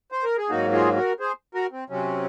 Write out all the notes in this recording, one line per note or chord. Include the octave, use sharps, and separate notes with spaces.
C5
A#4
G#4
G#2 F#3 A#3 D#4 F#4
F4 G#4
F#4 A#4
G#4 C5
F#4 A#4
C4
C3 F#3 C4 C#4